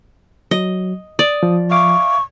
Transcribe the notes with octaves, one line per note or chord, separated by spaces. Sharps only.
F#3 D#5
D5 D#6
F3
E5 F5 C#6 D6